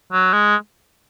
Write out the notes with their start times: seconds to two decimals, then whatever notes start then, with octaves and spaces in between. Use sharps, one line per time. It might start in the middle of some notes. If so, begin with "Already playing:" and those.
0.12 F#3
0.33 G#3